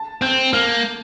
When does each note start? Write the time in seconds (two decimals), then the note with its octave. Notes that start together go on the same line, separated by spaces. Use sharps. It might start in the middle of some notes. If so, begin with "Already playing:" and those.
Already playing: A5
0.22 C4 G6
0.53 A#3 F6